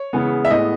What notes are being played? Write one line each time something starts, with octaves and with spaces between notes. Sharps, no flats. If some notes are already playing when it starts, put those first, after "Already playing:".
Already playing: C#5
C#3 E3 G#3 B3
E5
A2 G#3 B3 D#5